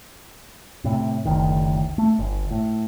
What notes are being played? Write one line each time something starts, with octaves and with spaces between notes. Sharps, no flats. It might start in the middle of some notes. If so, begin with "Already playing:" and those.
A2 C3
F#1 D2 D#3
A3
G1
A2